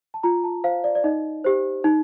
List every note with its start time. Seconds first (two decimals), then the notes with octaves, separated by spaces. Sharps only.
0.14 A5
0.23 F4 A#5
0.44 A5
0.64 C5 F5
0.84 D5
0.95 D5
1.04 D#4 D#5
1.44 G4 C5
1.84 D#4